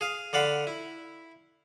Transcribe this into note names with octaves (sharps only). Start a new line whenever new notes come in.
G#4 F5
D3 D5 F5 F#5 B5
E4